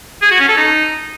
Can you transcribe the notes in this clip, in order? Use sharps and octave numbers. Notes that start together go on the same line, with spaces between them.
G#4
F#4
C#4
A4
D#4